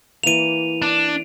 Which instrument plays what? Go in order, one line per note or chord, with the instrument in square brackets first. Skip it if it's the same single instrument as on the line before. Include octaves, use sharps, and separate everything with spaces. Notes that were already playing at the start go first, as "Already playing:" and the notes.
[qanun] E3 A#3 [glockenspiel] D#7 F7
[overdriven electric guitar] D4